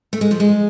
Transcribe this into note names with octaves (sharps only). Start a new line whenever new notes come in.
A3
G#3
F3
G#3